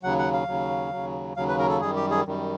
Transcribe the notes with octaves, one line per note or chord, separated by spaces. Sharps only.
D#2 C#3 F#3 F#5
F#5
F5
D#2 C#3 F#3
D#2 C#3 F#3
D#2 C#3 F#3 F5
B4
A#4
A4
F#2 D#3 G3 G#4
G4
G#4
F#2 D#3 G3